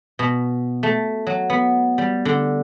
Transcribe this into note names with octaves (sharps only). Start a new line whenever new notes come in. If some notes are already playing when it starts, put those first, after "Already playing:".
B2
A3
F#3
B3
G3
D3